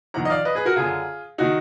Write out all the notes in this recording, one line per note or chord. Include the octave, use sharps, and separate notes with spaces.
F2 D#3 F#5 A#5
D#5
D5 F5
B4 D#5
G#4 B4
F#4 A#4
F#2 D3 F4 G#4
D#3 D#4 F#4